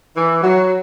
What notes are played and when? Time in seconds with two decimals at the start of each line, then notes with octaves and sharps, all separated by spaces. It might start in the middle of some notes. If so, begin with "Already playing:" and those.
0.16 E3
0.43 F#3